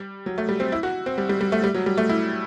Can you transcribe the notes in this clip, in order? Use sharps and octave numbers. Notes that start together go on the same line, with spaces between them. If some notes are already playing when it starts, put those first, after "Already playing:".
Already playing: G3
F#3
A3
G3
C4
E4
F#4
C4
G3
G3
G3
A3
G3
F#3
G3
A3
E4